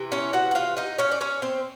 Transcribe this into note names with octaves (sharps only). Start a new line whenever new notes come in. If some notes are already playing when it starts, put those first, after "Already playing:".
Already playing: C3 E3
C#4 C#5
F#4 F#5
F#5
F4 F5
D#4 D#5
C#4 C#5
D5
C#4 C#5
C4 C5